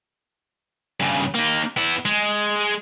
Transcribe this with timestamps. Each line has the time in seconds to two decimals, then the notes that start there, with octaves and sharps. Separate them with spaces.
1.00 G2 C#3
1.35 A#3 D#4
1.77 B3 E4
2.05 G#3